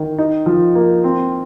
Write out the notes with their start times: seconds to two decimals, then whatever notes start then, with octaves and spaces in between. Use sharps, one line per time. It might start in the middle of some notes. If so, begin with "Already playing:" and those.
Already playing: D#3
0.18 D#4
0.46 F3
0.75 A#3
1.04 C4